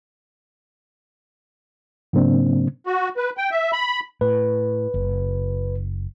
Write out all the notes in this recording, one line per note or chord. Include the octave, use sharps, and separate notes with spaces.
G#2 C#3 F#3 A#3 C4 D4
F#4
B4
G5
E5
B5
A2 B4
F#1